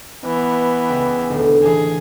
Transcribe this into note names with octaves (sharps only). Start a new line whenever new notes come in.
E3 B3
C#2 E4 G5
D#1 D2
A1 E3 G#4